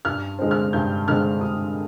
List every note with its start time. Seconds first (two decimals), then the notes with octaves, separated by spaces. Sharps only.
0.05 G2 F6
0.39 D3 G#3 C4
0.51 F6
0.73 G2 G6
1.08 D3 G#3 C4 F6
1.41 G2 D#6